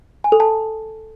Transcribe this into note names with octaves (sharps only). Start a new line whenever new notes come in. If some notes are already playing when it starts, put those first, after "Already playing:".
G#5
A4
A5